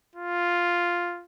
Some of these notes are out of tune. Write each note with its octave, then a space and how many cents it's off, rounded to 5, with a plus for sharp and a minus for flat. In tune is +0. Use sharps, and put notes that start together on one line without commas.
F4 +0